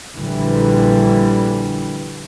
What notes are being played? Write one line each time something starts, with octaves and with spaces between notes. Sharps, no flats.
A#1 D3 E3 G3